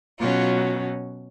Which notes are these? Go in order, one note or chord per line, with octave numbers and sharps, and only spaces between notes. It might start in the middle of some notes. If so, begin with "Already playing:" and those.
B2 F#3 C#4 F4